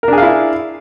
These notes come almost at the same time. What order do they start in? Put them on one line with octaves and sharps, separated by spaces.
A#4 D4 G#4 F5 E4